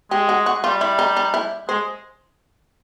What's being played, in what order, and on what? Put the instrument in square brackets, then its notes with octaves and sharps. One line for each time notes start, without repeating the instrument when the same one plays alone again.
[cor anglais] G#3 [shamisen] G4
[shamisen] F#4
F#4
[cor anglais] G3 [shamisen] F4
[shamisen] E4
D#4
D#4
E4
[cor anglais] G#3 [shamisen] C5